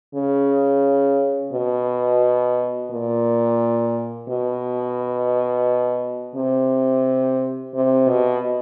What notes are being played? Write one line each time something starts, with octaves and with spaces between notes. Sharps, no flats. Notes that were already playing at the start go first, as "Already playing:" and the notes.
C#3
B2
A#2
B2
C3
C3
B2